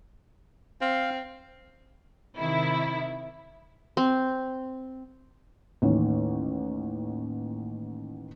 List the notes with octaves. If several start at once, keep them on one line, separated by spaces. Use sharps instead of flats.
C4 F5
C3 D#3 E4
C4
A1 D#2 C#4 C#5